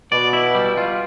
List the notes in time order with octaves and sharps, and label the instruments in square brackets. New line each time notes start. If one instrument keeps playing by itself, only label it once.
[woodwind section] B2 [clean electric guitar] D5
[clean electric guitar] E4
G3
F4